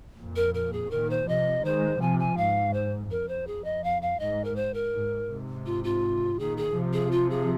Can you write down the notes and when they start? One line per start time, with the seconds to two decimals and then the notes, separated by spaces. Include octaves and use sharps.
0.18 F2 A#2
0.36 A#4
0.54 A#4
0.73 G#4
0.91 A#2 D#3 A#4
1.10 C5
1.28 C3 F3 D#5
1.64 D#3 G#3 C5
2.01 C3 F3 G#5
2.19 G#5
2.37 G#2 F5
2.73 C5
3.10 F2 A#4
3.28 C5
3.47 G#4
3.64 D#5
3.84 F5
4.02 F5
4.19 G#2 D#5
4.44 A#4
4.56 C5
4.74 A#4
4.93 G#2
5.29 G#2 C3
5.66 F4
5.84 F4
6.39 A#2 D#3 G#4
6.57 G#4
6.75 C3 F3
6.93 G#4
7.11 F4
7.30 G#4